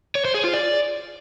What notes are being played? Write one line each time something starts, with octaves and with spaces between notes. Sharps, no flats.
C#5
C5
G#4
F4
D5